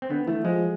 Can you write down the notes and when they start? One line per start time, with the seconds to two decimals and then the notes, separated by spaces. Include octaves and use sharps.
0.02 C4
0.10 D3 B3
0.27 E3 A3
0.44 F3 G#3